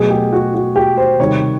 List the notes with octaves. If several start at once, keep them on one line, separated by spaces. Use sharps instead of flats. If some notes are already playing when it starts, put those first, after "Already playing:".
Already playing: B2 F#3 A3 G#4
G4
F#4
F#4
G4
C5
C3 D#3 G3 C#5